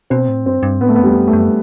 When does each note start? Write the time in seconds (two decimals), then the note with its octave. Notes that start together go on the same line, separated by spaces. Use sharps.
0.10 B2 C4
0.28 A2
0.46 G2 C4
0.63 G2
0.81 A2 B3
0.89 A3
0.96 F#2 B3
1.04 G3
1.10 E2
1.16 F#2
1.28 A3
1.33 F#2